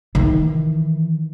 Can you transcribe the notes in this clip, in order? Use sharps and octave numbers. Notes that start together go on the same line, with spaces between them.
D#3 E3